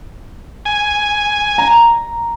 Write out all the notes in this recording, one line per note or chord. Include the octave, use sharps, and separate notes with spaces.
G#5
A#5